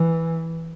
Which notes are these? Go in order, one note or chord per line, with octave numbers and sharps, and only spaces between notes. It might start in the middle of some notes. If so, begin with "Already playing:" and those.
Already playing: E3